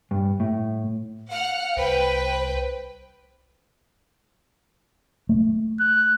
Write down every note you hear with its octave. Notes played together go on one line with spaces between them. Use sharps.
G2
A2
F5 F#5 F6
C2 B4 C5 G5
A3
F#6